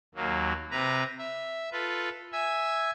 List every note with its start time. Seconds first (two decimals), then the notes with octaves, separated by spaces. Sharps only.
0.15 D#2 F#3 A#3
0.71 C3 B4 A#5
1.19 E5
1.72 F4 A4 B4
2.32 E5 G#5 E6